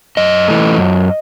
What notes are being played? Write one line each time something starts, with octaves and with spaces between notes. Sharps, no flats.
F#2 D#5
E3 A3
F#2